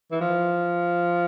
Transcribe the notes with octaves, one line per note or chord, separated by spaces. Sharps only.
E3
F3